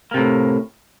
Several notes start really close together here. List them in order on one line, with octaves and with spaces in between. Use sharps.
A#3 C3 A2